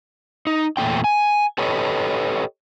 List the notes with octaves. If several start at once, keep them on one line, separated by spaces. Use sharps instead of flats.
D#4
E2 A#2 A3 C#4 G5
G#5
G4 A4 B4 C#5 D#5